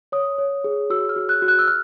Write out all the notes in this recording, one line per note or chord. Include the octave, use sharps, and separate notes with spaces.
C#5 D#6
C#5
G#4
F#4 E6
F6
F#4
F#6
F#4
F#6
E6
F6